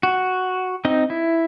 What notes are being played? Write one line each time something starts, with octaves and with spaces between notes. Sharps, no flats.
F#4
C4 D#4 D#5
E4